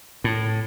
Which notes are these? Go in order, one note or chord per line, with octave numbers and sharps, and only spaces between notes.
A2